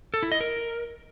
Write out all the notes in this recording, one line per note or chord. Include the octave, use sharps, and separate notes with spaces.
A4
E4
D#5
A#4